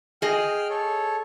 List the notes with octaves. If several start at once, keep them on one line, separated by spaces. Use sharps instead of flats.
G#4 D#5 G5 F6
A4 C#5